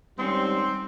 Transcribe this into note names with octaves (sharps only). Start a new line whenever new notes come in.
G#2 D#3 G3 C4 C#4 C5